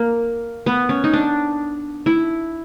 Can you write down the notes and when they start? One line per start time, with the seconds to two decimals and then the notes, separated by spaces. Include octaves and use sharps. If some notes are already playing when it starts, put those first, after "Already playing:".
Already playing: A#3
0.66 B3
0.89 C#4
1.04 D#4
1.13 D4
2.06 E4